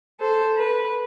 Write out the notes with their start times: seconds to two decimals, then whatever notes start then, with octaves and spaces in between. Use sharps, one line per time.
0.20 A4 C5
0.58 B4